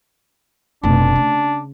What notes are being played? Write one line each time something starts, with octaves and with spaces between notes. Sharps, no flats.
F1 B2 D4
C#3